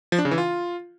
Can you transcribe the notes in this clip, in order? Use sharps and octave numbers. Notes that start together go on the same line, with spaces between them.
F3
D4
C#3
E3
F4